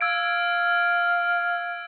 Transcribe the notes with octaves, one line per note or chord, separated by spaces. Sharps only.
F5 E6 G#6 D7